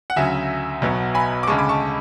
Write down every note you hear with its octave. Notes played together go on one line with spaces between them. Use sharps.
F#5
D2 C#3 F#3 E5 G#5
B1 B2 F#3 B3
G#5 B5
D6
D2 C#3 G#3 A5 C#6
B5 D6
A5 C#6